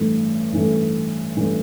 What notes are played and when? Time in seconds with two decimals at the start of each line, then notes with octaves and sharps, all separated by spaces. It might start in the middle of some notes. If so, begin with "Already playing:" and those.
Already playing: A1 G2 E3 A3
0.52 A1 G2 E3 A3
1.36 A1 G2 E3 A3